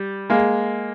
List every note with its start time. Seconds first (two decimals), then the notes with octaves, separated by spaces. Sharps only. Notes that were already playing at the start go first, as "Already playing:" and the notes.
Already playing: G3
0.30 G#3 A#3